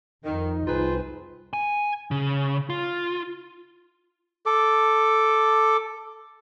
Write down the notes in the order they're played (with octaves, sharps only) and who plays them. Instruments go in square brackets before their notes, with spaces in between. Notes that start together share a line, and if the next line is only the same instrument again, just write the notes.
[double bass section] F2 [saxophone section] D#3 [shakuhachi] D#4
[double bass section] C2 [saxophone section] C4 G#4 B4 [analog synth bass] F4
[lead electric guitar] G#5
C#3
F4
[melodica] A4 D6